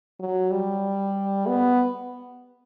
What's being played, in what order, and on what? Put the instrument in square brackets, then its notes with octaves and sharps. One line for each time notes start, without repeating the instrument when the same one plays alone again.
[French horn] F#3
G3
B3